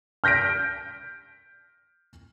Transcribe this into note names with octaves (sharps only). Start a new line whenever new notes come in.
F6 G6 A#6 B6 D7